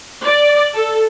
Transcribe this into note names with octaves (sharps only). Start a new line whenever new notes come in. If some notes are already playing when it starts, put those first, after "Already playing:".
D5
A4